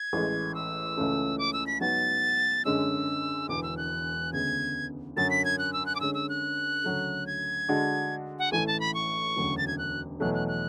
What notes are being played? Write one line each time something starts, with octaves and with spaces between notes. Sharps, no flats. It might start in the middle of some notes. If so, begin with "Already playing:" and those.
Already playing: G#6
A1 A2 G#3
E6
C#2 C#3 E3 A3 C#4
D6
E6
B6
G#2 F#3 B3 F#4 B4 A6
F#2 D3 G#3 C#4 E6
E1 E2 D3 D6
E6
F#6
D2 C#3 G#3 B3 G#6
F#2 D3 F#3 A6
B6
G#6
F#6
E6
F#6
D6
D3 G#3 C#4 E6
E6
F#6
D2 C#3 F#3 A3
G#6
D3 G#3 D4 F#4
F#5
A1 A2 E3 A3 G#5
A5
B5
C#6
E1 D2 C#3 F#3
A6
G#6
F#6
E2 B2 F#3 A3 F#6
F#6
F#6